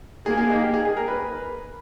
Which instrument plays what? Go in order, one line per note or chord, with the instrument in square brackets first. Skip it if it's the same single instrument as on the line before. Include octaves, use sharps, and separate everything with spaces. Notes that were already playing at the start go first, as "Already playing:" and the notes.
[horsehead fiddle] A#3 [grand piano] G#4
[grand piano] G#4
D#4
G4
G#4
G#4
A#4
B4